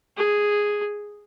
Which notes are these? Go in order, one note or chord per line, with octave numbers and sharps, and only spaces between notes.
G#4